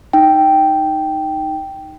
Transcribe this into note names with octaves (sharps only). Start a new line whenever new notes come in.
D#4 G5